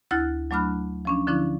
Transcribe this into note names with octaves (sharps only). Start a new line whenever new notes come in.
D2 E4 F6 F#6 A6
F#3 A3 D4 B5 F6 F#6
F3 C#4 D4
D3 F3 C#4 D4 E4